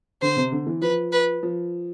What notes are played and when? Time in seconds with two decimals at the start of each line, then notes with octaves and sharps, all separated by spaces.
0.22 D3 C5
0.37 C3
0.52 D3
0.67 E3
0.81 F3 B4
1.12 B4
1.43 F3